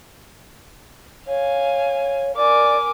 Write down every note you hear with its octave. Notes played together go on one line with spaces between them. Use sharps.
C#5 F5 G#5
A#4 D5 G#5 D6